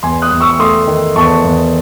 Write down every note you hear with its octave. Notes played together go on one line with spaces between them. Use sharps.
E2 G#5 C6
D#6 F#6
E2
C#6 E6
A3 C6 D#6
D#3
E2 A5 C#6
E2